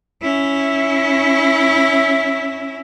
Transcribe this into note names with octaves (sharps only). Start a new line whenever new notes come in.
C#4 E4